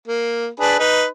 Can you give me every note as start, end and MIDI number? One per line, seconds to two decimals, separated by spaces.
0.08 0.48 58
0.60 0.77 62
0.60 0.77 68
0.60 0.77 71
0.79 1.05 63
0.79 1.05 71